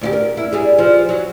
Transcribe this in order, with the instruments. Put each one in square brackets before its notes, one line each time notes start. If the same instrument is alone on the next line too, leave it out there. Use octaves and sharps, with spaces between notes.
[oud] D2 E4 G4
A#4
E4
G3 G#4
F3
F#3